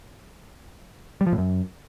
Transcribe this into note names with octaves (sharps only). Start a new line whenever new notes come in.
G3
F3
A2
F#2